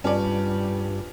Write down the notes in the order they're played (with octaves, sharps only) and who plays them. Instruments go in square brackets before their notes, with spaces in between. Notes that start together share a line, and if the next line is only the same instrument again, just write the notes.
[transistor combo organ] G2 [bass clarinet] G3 [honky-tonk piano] C#4 D5 [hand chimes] F4 B4 A5